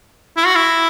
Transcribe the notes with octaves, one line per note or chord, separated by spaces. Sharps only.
E4
F#4
E4